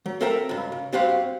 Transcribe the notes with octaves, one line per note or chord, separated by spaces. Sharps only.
F#3
C4 A4 A#4 E5 G5 A#5
C#2 G2
C#3
G2 C4 F#4 G4 C5 F5